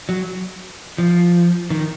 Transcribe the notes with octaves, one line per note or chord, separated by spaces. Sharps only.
F#3
F3
D#3